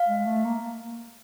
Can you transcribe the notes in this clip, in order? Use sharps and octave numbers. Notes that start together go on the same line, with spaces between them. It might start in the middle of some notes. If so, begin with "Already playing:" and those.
Already playing: F5
G#3
A3
A#3